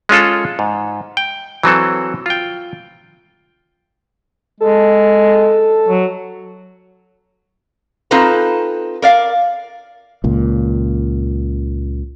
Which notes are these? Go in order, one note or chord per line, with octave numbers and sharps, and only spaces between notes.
G#3 C#4 F4 A4
G#2
G5
E3 F#3 C4 A4
F4 G5
G#3 A4
F#3
C4 D#4 F4 A4 B4 A#5
A#4 D5 F5
C#2 A#2